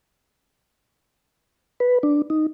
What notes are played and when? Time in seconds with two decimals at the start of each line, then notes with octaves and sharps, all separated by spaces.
1.80 B4
2.03 D4
2.30 D#4